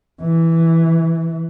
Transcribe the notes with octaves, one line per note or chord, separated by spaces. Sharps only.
E3